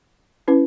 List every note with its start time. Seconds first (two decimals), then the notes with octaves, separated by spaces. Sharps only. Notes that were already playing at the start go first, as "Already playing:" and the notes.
0.48 C#4 E4 B4